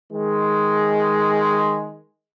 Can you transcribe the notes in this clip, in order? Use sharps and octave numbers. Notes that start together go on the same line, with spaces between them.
D#3 G#3